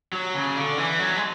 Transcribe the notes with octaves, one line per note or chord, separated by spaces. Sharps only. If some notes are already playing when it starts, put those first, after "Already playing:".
F#3
C#3
D3
E3
F#3
G#3